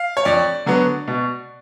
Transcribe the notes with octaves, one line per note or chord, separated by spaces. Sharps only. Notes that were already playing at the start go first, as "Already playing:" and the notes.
Already playing: F5
C#5
F2 D5
D3 F#3 B3
B2